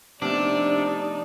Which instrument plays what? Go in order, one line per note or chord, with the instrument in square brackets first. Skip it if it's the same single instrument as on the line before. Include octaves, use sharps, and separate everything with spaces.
[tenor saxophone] C3 [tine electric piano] F3 A3 B3 [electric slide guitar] D4 [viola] D#4 D5